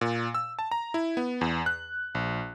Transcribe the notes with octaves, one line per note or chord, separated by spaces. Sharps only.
A#2
E6
A5
A#5
E4
B3
E2
F#6
A#1